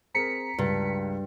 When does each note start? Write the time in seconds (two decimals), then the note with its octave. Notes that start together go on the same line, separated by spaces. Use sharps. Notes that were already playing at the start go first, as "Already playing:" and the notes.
0.14 C4 G#4 A#4 A#5 B6 C#7
0.58 C#2 G2